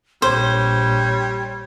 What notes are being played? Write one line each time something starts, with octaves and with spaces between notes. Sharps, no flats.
A#1 G3 C5 C#5